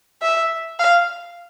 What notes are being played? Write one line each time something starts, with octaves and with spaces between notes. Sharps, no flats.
E5
F5